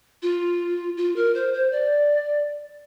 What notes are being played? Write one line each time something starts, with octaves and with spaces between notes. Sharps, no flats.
F4
F4
A#4
C5
C5
D5